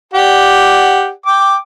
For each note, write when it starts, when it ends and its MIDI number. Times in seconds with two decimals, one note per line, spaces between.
0.13 1.10 67
0.13 1.10 74
0.13 1.10 78
1.26 1.56 79
1.26 1.56 86